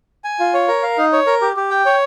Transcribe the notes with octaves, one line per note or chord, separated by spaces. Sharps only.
G#5
F4
C#5
A#4
F5
D#4
C#5
A#4
G4
G4
G5
C#5